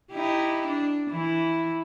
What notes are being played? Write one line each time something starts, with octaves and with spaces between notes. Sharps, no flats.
D#4 E4 G4
D4
E3 E4